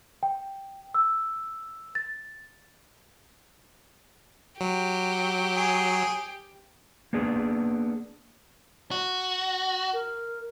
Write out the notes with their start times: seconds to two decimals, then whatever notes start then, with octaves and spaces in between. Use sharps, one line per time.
0.23 G5
0.94 E6
1.95 A6
4.61 F#3 G4
5.56 G#4
7.13 A#3 B3 D4 G#4
8.91 F#4
9.93 A#4